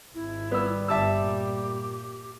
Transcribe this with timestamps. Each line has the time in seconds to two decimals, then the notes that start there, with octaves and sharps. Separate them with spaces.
0.14 G#1 E4
0.51 G3 B3 E6
0.88 G1 G2 G4 E5 A5 E6
1.21 A#2